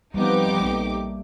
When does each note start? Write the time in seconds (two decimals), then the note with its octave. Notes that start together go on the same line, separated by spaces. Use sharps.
0.14 F3 G3 B3 C4 D#4 G4 D6
0.60 A#1 A3 A#3